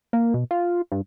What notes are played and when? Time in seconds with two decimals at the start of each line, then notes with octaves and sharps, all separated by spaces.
0.13 A#3
0.34 B2
0.51 F4
0.92 G2